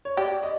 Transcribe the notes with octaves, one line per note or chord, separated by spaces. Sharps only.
C#5
G4 D5
D#5